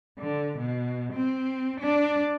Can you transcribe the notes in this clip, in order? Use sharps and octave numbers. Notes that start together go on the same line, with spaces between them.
D3
B2
C4
D4